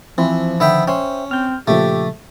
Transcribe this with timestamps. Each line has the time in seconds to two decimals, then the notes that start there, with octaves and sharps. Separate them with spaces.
0.18 E3 F3 C4 F4
0.60 D3 D#3 B3 E5 G5
0.88 C#4 C5 E5 G5
1.31 C4 F6 G6
1.68 A#2 C#3 F3 A3 G4